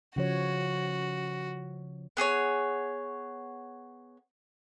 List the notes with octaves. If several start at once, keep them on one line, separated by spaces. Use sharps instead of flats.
C#3 F3 F#4 C#5
B3 G#4 A4 C#5